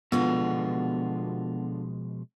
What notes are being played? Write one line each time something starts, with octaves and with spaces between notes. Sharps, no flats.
B2 D3 F3 G#3 B3 F4 F#4